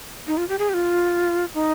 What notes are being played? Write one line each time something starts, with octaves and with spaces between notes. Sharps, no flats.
D#4
F4
G4
G#4
G4
F4
D#4